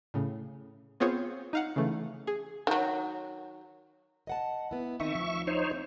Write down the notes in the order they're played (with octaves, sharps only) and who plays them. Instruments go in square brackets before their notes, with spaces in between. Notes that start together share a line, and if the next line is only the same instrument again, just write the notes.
[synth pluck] A2 C#3
B3 C4 F4 G#4 C5 C#5
D#4 F5 F#5
C#3 E3 A3
G#4
[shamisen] D#3 F#3
[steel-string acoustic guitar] D#5 F#5 A5
B3 E4
[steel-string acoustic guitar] D#3 C4 D#4 [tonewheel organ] E5 C#6
[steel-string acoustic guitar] D2 F3
[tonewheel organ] D#4 C5 C#5
[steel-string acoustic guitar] C4